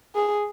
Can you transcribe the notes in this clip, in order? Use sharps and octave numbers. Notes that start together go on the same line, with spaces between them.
G#4